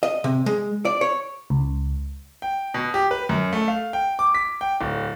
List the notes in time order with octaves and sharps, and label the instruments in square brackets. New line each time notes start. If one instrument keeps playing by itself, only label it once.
[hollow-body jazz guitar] D#5
C3
G#3
D5
C#5
[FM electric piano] C#2
[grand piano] G5
B2
G4
B4
F#2
A3
F5
G5
D6
B6
G5
D1